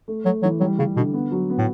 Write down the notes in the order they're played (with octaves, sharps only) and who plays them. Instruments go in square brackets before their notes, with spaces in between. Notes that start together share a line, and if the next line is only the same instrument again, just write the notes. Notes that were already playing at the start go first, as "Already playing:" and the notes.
[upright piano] A3
[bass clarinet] F#3 [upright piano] A3
[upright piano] E3 [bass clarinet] F#3
[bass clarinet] F#3 [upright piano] G3
[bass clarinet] C#3 [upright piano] G3
[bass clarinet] B2 [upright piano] D3
[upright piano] B3
F#3
B3
[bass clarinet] A2